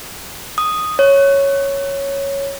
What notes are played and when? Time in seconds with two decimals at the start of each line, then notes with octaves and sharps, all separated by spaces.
0.58 D#6
0.99 C#5